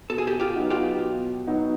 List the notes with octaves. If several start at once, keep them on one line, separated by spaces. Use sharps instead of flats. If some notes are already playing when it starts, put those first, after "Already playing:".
B2 A4
G#4
G4 A4
F4 G4
F#3 B3 D#4 F#4
F4 G4
B2
F#3 B3 D#4 F#4